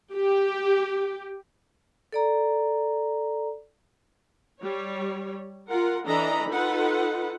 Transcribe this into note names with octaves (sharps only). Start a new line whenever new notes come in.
G4
A4 D5 A#5
G3 C#5
F4 A#4 F#5
E3 D4 A4 D#5 A#5 B5
D#4 F4 A4 B4 F#5